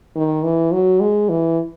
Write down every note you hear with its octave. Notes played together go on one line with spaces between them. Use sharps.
D#3
E3
F#3
G#3
E3